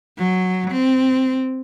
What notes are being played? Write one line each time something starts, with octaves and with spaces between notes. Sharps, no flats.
F#3
C4